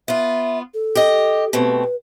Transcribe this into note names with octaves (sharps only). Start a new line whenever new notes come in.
B3 F4 E5
A4
G4 D#5
B2 A3 C4 B4